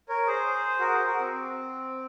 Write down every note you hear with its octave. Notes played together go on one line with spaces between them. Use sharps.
A#4 C#5
G#4 C5
F#4 A#4
G#4 C5
F#4 A#4
C4